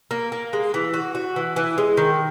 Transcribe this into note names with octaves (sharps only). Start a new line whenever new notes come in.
A#3
A#3
G#3
E3
F#4
F#4
E3
E3
G#3
D#3